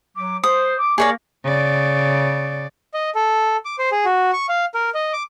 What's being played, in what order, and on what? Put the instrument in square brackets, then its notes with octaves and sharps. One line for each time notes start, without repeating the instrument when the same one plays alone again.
[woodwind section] F#3 D6
[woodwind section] C5 [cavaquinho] D#6
[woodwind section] D6
[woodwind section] A#3 A#4 [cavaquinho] G#4 C#5 D5
[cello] C#3 D5
[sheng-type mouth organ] D#5
A4
D6
C5
G#4
F#4
C#6
F5
A#4
D#5
D6